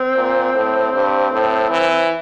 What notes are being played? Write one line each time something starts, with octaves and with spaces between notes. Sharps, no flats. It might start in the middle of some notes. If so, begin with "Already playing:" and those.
Already playing: C4
A#2
A2
G2
A2
E3